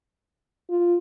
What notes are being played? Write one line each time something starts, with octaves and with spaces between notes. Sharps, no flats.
F4